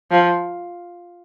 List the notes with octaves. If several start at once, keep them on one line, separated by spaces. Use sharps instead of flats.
F3